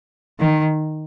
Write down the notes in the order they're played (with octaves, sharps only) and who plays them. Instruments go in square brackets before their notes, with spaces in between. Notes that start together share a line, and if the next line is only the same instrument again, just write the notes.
[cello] D#3